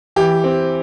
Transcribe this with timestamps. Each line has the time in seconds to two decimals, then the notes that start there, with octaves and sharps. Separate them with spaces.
0.16 E3 G4
0.44 C4